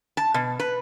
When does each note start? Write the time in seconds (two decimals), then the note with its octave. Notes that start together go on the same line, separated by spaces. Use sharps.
0.17 A5
0.34 B2
0.60 B4